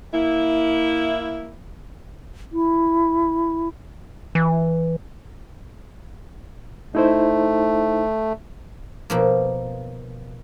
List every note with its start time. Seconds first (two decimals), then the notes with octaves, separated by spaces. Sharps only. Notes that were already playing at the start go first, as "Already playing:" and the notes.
0.14 A#3 E4
2.52 E4
4.35 E3
6.95 A3 D#4 E4 C5
9.10 B2 F3 A#3